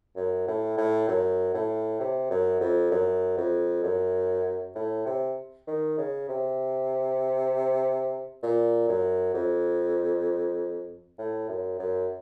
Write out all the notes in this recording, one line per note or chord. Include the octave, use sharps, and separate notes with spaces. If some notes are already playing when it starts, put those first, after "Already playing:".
F#2
A2
A2
F#2
A2
C3
F#2
F2
F#2
F2
F#2
A2
C3
D#3
C#3
C3
A#2
F#2
F2
A2
F#2
F#2